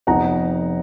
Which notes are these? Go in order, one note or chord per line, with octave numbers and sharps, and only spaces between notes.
F1 F2 F3 B3 D#4 F#5 A#5